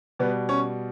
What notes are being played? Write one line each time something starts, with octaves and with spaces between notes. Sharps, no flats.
B2 G3 B3
C#4